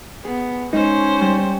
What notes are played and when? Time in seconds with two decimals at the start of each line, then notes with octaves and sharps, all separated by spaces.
0.25 B3 G#4
0.73 G#3 C#4 D#4 C5
1.21 G3